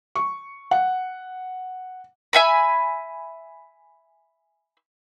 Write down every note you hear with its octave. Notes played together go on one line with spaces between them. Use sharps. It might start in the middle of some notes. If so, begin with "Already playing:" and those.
C#6
F#5
E5 G#5 B5